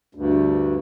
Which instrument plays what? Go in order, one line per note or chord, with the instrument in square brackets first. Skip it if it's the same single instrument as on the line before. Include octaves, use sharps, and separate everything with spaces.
[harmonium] D2 G2